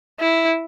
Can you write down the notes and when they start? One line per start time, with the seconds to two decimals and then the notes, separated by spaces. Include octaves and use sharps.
0.20 E4